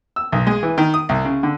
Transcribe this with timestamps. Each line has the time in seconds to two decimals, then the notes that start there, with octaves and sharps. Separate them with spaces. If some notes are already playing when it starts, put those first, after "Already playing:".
0.16 E6
0.32 B1
0.47 G#3
0.63 E3
0.78 D#3
0.94 D#6
1.09 C2
1.25 C#3
1.43 D3